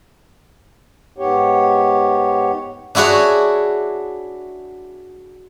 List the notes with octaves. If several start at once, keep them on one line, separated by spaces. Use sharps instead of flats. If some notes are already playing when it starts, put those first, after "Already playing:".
G#2 B3 G4 C#5
D4 E4 F#4 G#4 C#5